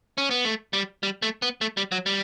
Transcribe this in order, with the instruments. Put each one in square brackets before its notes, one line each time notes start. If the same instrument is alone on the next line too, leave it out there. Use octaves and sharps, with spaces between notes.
[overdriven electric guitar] C#4
B3
A3
G3
G3
A3
B3
A3
G3
F#3
G3